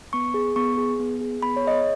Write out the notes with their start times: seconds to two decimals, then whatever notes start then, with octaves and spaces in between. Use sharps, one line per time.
0.13 B3 C#6
0.34 G#4
0.56 B3 C#6
0.78 G#4
0.99 B3
1.21 G#4
1.43 B3 B5
1.57 C#5
1.64 G#4 D#5
1.71 C#5